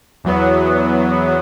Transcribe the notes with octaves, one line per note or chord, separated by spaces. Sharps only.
E2 F#3 B3